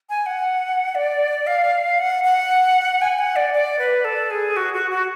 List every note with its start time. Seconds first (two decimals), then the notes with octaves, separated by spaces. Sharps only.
0.10 G#5
0.26 F#5
0.95 D5
1.47 F5
1.98 F#5
2.24 F#5
3.02 G#5
3.19 F#5
3.36 D5
3.53 D5
3.79 B4
4.04 A4
4.31 G#4
4.56 F#4
4.74 F#4
4.91 F#4